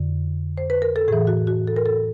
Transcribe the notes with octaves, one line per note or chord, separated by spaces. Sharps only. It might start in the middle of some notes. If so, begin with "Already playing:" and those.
Already playing: F2 D3
C5
B4
A#4
A4
A2 E3 G#4
F#4
F#4
A4
A#4
A4